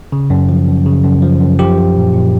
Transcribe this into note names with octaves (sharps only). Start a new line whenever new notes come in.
C#3
F#2
F3
F#2
C#3
F#2
F3
F#2
F3 G4
F3
A#2
A#2